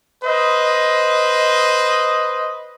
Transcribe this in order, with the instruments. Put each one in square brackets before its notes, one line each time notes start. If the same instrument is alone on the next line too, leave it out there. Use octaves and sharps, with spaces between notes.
[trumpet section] B4 C5 D#5